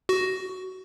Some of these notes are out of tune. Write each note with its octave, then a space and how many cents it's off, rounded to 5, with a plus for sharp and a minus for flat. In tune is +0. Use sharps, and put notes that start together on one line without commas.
F#4 +15